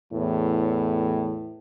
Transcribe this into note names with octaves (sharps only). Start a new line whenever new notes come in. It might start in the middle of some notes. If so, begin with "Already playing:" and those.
E2 A2